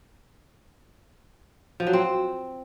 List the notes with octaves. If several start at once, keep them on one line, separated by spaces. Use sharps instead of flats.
F3
F#3
C4